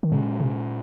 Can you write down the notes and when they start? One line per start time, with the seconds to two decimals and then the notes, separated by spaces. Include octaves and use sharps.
0.03 D#3
0.12 A#2 C#3 G#3 C#4
0.40 C3